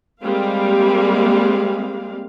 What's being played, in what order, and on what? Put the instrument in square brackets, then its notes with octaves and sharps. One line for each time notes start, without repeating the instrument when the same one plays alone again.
[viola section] G3 G#3 A#3 C4 F5